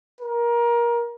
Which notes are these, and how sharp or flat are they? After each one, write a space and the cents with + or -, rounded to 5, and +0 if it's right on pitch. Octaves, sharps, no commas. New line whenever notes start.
A#4 +20